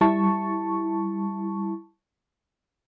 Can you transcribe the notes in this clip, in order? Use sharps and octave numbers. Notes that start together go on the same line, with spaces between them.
G3 E4 A5 C#6